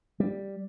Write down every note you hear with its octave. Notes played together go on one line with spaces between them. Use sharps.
G3